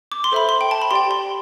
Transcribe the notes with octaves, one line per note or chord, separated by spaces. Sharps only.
D6
C6
A4 C5 E5 B5
C6
G5
A5
B5
G4 D5 G5 C6
C6